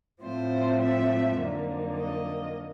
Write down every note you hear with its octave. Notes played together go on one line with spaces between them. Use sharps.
A2 F3 A3 C4 C5
E5
F2 D3 F#3 A#3 D#4
D#5